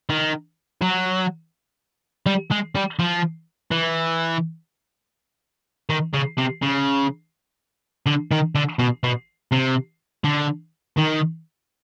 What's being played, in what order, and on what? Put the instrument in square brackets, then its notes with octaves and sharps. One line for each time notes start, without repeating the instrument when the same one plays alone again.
[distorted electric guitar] D#3
F#3
G3
G#3
G3
F3
E3
D#3
C#3
C3
C#3
D3
D#3
D3
B2
B2
C3
D3
D#3